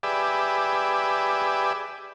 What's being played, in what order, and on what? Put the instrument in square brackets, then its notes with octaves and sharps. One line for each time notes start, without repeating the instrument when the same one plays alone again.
[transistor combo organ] G4 G#4 B4 D5 E5